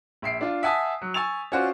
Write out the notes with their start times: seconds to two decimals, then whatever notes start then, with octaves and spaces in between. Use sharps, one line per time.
0.22 A#1 E5 C7 D7
0.41 D4 F4
0.63 E5 F#5 G#5 A5 D#6 B6
1.02 F#3
1.14 G#5 C#6 E6 A6 F7
1.52 C#4 F4 F#4 C5 D5